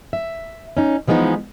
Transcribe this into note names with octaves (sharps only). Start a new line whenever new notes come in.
E5
C#4 D#4
E3 F3 G#3 B3 D#4